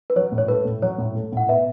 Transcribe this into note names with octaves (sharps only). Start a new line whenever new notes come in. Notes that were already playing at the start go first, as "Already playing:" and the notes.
B4
F#3 C#5
A2
C#5
A3 B4
A2
F#3 C#5
A2
A3
A2 F#5
B2 B4 E5